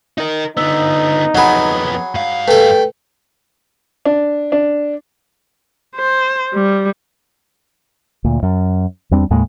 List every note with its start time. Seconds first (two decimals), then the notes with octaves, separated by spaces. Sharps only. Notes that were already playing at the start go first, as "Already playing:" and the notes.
0.18 D#4 A#4
0.57 D3 B3 D#4 E6
1.35 F2 F#3 B3 G#4 F#5 B5
2.15 G2 F5
2.48 A3 A4 B4 G5
4.05 D4
4.52 D4
5.96 C5
6.54 G3
8.24 D2 A#2
8.43 F#2
9.11 E2 G3 C4 D4
9.30 D#2 A2 G#3 A#3